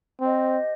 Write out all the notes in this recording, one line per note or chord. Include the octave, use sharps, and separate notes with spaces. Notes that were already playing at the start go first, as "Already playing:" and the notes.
C4 G4 C5 D#5